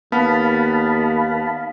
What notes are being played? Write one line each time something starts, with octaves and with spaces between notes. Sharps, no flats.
D#2 B3 F5 A5 B5